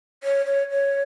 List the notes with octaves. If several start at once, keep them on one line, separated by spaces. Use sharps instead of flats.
C#5
C#5
C#5